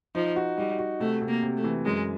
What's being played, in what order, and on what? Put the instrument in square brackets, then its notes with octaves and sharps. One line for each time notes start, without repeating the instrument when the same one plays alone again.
[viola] F3 [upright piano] D#4
[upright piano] F#4
[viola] G3 [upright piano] D#4
[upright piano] F#4
[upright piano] C3 [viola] A3
[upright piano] C3
[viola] A#3
[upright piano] C3
[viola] A3
[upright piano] E3
[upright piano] F#2 [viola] G#3